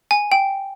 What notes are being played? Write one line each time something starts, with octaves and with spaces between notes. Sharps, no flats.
G#5
G5